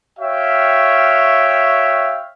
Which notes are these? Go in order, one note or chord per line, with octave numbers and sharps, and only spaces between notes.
F#4 C#5 E5 F5 G5